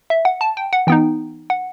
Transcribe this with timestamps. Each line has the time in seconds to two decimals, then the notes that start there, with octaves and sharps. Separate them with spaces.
0.10 E5
0.25 F#5
0.41 A5
0.57 G5
0.73 F#5
0.87 E3 B3 D#4 G5
1.50 F#5